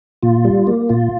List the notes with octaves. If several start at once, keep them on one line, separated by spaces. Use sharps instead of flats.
A#2 F4
G3
A#3
A#2 F4